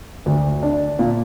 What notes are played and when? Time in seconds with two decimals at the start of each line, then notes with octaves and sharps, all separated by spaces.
0.26 D2
0.63 D4
0.99 A#2